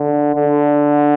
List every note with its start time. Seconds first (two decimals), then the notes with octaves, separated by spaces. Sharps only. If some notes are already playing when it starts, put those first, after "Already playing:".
Already playing: D3
0.35 D3